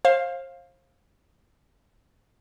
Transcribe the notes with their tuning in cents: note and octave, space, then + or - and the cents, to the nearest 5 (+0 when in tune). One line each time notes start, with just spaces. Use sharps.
C5 +35 F5 +0